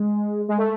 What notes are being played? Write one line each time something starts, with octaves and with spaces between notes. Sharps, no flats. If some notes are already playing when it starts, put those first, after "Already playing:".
Already playing: G#3
G#3
A3